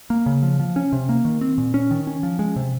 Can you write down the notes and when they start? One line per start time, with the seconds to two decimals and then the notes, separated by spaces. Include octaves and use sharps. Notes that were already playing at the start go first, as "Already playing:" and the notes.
0.10 A#3
0.26 C#3
0.43 F3
0.60 F3
0.76 C#4
0.92 C3
1.09 A#3
1.25 D#3
1.41 C4
1.58 A#2
1.74 C#4
1.91 D#3
2.07 C#4
2.23 F3
2.39 G#3
2.56 C3